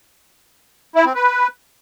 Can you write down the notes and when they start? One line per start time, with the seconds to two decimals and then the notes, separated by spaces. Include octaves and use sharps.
0.96 E4
1.05 C4
1.15 B4